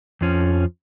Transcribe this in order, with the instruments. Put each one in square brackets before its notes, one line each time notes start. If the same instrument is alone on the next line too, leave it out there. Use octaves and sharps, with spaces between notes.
[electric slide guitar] F2 F3 C#4